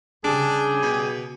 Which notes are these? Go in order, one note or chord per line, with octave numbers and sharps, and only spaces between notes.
C#3 G3 D4 G4 G#4
B2